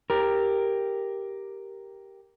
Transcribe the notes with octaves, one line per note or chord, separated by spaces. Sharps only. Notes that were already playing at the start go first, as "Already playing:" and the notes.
G4 A#4